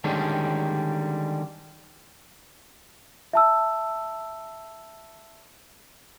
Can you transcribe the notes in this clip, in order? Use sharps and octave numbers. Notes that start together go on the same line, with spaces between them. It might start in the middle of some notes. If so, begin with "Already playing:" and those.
D3 D#3 G3 G#3 C#4 D4
E5 A5 E6